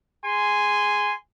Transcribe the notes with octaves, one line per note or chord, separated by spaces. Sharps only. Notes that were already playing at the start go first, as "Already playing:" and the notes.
G#4 G#5 C6